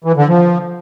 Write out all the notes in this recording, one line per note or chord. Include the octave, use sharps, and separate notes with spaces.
E3
D3
F3